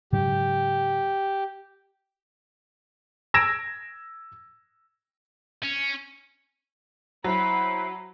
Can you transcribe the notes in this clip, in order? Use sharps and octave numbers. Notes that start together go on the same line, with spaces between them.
G#2 C#3 F#3 G4
E6 G#6 A#6 D7 E7
C#4
F#3 E4 C5 B5